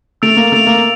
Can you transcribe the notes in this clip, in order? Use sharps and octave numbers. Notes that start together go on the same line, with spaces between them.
A3 E6 A6 D7 F7
A#3
A3 E6 A6 D7 F7
A#3